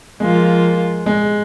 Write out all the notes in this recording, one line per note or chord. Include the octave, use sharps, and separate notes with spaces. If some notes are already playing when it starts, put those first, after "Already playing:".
F3 G#3 A#3 F4
G#3